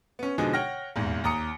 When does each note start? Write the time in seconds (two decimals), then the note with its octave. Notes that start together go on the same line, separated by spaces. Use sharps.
0.19 B3 C#4
0.38 B2 D3 F3 G#3 D#4 G#4
0.53 C#5 F#5 G5 F6 A#6
0.96 D#1 E2 G#2
1.24 D#2 A#5 D#6 C#7